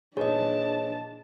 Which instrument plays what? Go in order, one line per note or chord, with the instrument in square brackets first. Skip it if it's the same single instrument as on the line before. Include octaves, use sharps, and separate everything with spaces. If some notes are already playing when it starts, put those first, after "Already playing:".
[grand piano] A#2 B3 D#4 [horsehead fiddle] D4 A5 [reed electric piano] G#4 [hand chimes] C#5 D#5